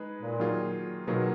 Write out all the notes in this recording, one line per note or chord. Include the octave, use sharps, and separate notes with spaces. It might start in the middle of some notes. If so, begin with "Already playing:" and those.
Already playing: G#3 D#4 G#4 B4
A#2
D#3 F#3 A#3 F4 G#4
B2 D#3 F#3 A#3 F4 G#4